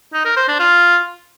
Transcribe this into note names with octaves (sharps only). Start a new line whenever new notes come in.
D#4
A#4
C5
D4
F4